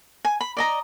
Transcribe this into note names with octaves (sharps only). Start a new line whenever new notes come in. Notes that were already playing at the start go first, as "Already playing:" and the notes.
G#5
B5
D5 D#5 A#5